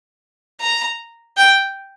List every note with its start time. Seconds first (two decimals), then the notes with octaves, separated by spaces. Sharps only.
0.61 A#5
1.37 G5